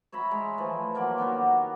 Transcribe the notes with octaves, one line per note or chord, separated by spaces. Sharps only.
C#5 E5 A#5 B5
G#3
E3 F3 A3
F#3 A#3 D5 C6
D#3 B3 F#4 G4